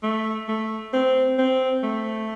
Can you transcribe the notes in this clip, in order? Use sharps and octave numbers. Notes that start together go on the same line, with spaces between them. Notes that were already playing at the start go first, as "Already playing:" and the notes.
A3
A3
C4
C4
A3